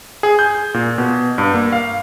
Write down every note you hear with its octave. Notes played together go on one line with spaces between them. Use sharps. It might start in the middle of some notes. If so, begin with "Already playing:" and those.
G#4
G6
A#2
B2
G2
A#3
F5